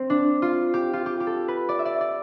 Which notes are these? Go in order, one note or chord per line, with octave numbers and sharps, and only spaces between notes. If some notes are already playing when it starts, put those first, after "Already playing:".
Already playing: C4
D4
F4
G4
F4
G4
G4
A4
B4
D5
E5
D5
D5